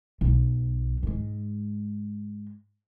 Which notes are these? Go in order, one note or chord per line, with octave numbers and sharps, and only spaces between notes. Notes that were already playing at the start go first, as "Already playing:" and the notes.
B1
G#2 G#3